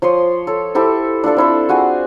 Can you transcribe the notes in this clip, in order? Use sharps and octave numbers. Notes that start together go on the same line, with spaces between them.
F3 C#5 C6 D#6
A4 C#5
E4 G4 A4 C5
D4 F4 A4 D5
C4 E4 C5
F4 F#4 G#4 G#5